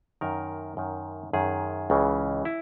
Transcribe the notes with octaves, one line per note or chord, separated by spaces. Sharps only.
F#2 D#3 A#4
F#2 D#3
F#2 D#3 G#4
C#2 C#3 E3
E4